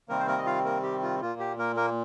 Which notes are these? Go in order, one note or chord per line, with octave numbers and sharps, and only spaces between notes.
C3 D#3 G3 A#3 C4 A#4
C5
A#3 A#4
D#5
F4 F5
A#3 A#4
G4
F4
A#2 A#3 F4
G4
A#3 A#4
A#3 A#4